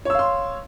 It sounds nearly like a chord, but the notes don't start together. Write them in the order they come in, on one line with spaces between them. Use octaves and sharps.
C#5 E6 F5 C6